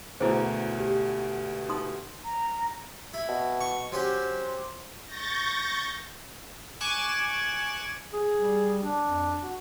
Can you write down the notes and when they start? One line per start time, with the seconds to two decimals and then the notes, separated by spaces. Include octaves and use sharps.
0.20 D2 B2 E4 G#4 C5
0.79 G4
1.69 D#4 C6 D#6
2.24 A#5
3.14 E4
3.28 B2
3.61 C#6
3.92 F#3 C#4 G4 C5
5.06 C#6 G6 A6 A#6
6.81 G#5 C#6 D6 F#6 E7
8.13 G#4
8.35 G3
8.83 D4
9.03 F2
9.42 F#4